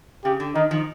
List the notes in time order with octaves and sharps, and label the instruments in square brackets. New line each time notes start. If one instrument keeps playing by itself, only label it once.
[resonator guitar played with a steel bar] C#3 [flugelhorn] G4
[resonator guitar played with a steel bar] D3
[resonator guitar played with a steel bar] D#3 [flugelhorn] D#4
[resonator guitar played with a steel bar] D#3 F3